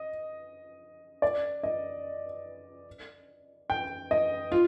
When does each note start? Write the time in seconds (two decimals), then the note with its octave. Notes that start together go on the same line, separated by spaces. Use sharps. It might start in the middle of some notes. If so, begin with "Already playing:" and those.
Already playing: D#5
1.22 D5
1.63 D#5
3.70 G5
4.11 D#5
4.52 F4